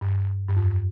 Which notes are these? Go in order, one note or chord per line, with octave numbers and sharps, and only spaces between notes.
G2
G2
F2